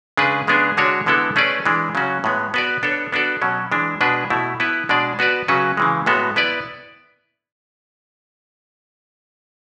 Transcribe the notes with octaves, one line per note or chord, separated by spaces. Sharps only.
C#3 G#3 D4 G#4 B4
C#3 G#3 B3 D4 G#4
D3 G#3 D4 F#4 C#5
D3 G#3 B3 E4 A4
A3 C#4 G#4 B4 D5
E3 G#3 D4
C#3 F#3 C#4 F#4
A2 G#3 B3
B3 F#4 B4 D5
B3 D4 A4 C#5
B3 D4 F#4 A4 D5
B2 F#3 C#4
E3 G#3 D4
B2 G#3 D4 G#4 B4
B2 A3 E4
B3 E4 B4
B2 G#3 D4 G#4 D5
B3 F#4 B4 D5
C#3 F#3 C#4 F#4 B4
C#3 E3 G#3
A2 G#3 B3 F#4 A4
B3 E4 B4 D5